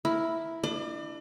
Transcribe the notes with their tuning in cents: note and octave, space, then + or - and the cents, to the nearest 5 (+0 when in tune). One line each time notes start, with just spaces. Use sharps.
E4 +0 A#4 +0
D4 +0 D5 +45